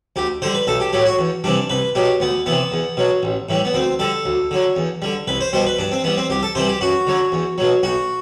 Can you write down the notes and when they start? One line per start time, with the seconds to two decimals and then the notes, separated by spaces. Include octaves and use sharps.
0.16 D2 G4
0.42 D3 G3 C5
0.54 B4
0.67 B1 A4
0.80 G4
0.93 A2 F#3 G4
1.06 F#4
1.19 E2
1.44 C3 E3 G3 D4
1.70 C2 B4
1.95 B2 F#3 G4
2.20 D2 B3
2.46 C3 E3 B3
2.72 E2
2.97 B2 F#3
3.23 A1
3.49 A2 E3 G3
3.65 B3
3.74 D2 C4
3.99 D3 G3 A4
4.25 D2
4.51 D3 F#3
4.76 E2
5.02 D3 G3
5.27 C2 B4
5.41 C5
5.53 B2 G3 C5
5.66 B4
5.79 G2 D4
5.91 C4
6.04 E3 G3 B3
6.17 C4
6.30 C2 G4
6.43 A4
6.55 C3 E3 G3 C5
6.68 G4
6.81 F#2 F#4
7.07 D3 F#3
7.32 E2
7.58 B2 F#3
7.83 B1 F#4